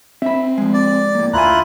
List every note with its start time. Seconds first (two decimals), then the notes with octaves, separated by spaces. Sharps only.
0.22 C4 E5 B5
0.58 F3 G#3
0.74 D5
1.15 A2 A#3
1.33 D2 E4 F4 G#5 A#5 F#6